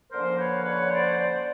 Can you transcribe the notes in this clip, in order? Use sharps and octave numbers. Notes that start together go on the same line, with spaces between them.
D3 F3 A#3 C#4 A#4 C5
B4 C#5
B4 C#5
C5 D5
C5 D5